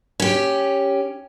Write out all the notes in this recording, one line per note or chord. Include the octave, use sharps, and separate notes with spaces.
C#4 G4